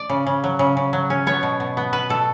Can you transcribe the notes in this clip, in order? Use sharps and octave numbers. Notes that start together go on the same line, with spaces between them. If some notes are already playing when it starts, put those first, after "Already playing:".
Already playing: D5
C#3
C#3
F#3
C#3
C#3
F#3
C#4
B3 C#5
B2
B2
B3
B3 B4
B2 A4